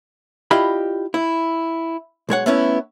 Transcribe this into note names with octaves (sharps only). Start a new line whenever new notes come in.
E4 F4 G4 D5 D#5 B5
E4
B1 G#3 C#5 F#5
A3 B3 C#4 E4